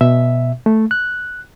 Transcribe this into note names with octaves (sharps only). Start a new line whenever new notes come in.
B2 E5
A3
F#6